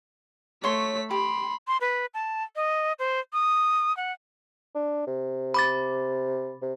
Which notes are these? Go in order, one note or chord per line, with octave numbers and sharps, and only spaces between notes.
A3 C#5 C6 B6
G4 B5 C6
C6
B4
A5
D#5
C5
D#6
F#5
D4
C3
B5 D6 A6
C3